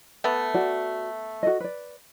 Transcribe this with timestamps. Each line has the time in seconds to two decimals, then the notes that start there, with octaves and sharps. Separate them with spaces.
0.24 A3 B3
0.54 F#4 D5
1.43 F#4 A4 D#5
1.60 B4 D5